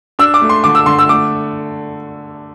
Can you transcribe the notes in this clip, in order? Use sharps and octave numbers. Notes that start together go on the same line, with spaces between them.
D4 E6
D6
A3
C6
D3 D6
E6
D3 C6
E6
A3 D6